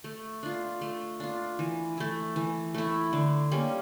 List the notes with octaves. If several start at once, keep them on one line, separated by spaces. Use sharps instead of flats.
A3
D4 F4
A3
D4 F4
E3
A3 E4
E3
A3 E4
D3
G3 A#3 C#4